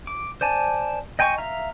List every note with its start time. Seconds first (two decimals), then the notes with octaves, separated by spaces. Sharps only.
0.07 D6
0.41 C5 D5 G#5 A5
1.19 D#5 G5 G#5 C6 C#6
1.38 E5 F5 A#5